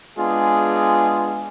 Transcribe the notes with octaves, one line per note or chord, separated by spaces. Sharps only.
G#3 B3 D4 F4 G#4